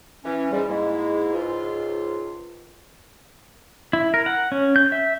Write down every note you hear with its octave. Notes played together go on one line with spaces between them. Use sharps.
E3 C#4
G#2 G3
G#2 G#3 A#3 E4
C#2 G#2 F4
E4
A#4
F#5
C#4
G6
E5